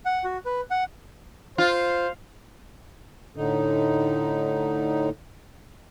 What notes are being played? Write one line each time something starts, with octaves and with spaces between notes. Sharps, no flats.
F#5
F#4
B4
F#5
F4 C5
A2 D3 D#4